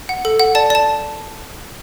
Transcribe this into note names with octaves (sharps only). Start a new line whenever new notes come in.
F#5
A4
F#5
D5 A5
D5 A5